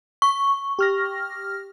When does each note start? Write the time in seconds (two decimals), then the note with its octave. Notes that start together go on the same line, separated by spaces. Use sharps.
0.22 C#6
0.79 G4 F6 A#6